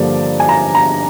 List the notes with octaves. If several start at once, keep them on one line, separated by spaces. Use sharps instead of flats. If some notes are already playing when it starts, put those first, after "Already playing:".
Already playing: G2 D3 F3 A#3 D5
G#5
A#5
A#5